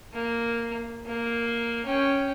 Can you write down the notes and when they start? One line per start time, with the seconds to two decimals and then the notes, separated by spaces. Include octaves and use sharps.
0.13 A#3
1.06 A#3
1.86 C#4 G5